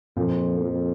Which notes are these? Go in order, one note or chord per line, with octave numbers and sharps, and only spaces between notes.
F2 A#2 F3 A#3
F2